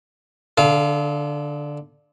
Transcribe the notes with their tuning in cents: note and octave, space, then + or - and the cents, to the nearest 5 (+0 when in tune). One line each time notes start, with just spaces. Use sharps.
D3 +0 A4 -45 F5 -10